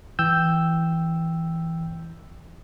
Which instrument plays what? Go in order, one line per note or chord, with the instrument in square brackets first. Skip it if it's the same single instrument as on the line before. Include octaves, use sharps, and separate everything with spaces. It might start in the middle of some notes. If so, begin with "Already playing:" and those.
[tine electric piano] E3 G5 E6 G6